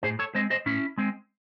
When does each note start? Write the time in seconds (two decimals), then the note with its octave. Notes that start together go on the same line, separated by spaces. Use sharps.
0.03 A2 G#4 C5
0.19 A4 C#5
0.35 G#3 C4 C5 D#5
0.51 C5 D#5
0.66 A2 C#4 E4
0.98 G#3 C4